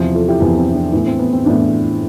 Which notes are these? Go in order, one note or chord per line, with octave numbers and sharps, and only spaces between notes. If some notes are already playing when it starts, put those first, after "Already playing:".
Already playing: E2 C3 F3
F4 A4
E4 G4
E2 C3 F3 B3
C4
D4
C4
A2 E3 B3
C4
B3
C4
A2 E3 B3 D4